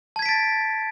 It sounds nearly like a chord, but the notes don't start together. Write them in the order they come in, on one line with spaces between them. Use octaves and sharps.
A5 G#6 B6 D7 A6